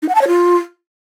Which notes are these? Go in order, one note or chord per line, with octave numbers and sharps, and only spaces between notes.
D#4
F#5
A5
C#5
F4